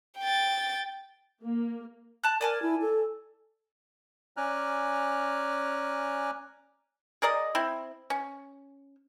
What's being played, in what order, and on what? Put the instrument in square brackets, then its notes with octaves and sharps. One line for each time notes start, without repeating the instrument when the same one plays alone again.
[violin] G5 A6
[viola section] A#3
[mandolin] A5 F#6
[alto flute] A#4 [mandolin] D5 G#5 A5
[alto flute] E4
A4
[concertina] C#4 D5 G#5 A#5 F6 F#6
[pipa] G#4 A#4 D5 D#5
C4 E4
C#4